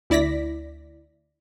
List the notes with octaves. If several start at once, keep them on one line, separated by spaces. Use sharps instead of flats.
D2 E4 D5 A#6 B6